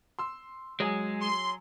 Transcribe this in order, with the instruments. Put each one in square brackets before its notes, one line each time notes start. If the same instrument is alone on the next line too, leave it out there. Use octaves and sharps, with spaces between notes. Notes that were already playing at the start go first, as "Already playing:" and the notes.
[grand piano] C6 E6
[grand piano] F#3 G#4 G#5 [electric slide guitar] G#3
[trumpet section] C6